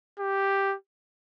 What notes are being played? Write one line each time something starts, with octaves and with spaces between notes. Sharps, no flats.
G4